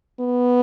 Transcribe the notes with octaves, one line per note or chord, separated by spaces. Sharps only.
B3